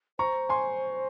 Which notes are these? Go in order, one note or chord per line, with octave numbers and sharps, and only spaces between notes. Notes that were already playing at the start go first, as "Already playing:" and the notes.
C5 A#5 C#6
G#5 C6